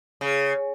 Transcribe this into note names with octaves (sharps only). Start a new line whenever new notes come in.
C#3